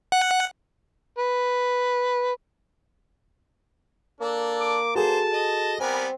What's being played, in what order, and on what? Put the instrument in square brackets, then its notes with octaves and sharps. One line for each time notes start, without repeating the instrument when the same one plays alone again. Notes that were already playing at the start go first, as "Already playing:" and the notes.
[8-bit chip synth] F#5
[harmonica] B4
[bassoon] A#3 [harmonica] D4 A4
[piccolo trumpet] D6
[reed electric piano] F#4 G#4 A4 [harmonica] C5 [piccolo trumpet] A5
[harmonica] D#5
[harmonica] G3 B3 G#5 [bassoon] C4 [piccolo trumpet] A#4